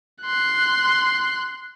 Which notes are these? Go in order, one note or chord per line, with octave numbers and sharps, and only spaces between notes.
C6 F#6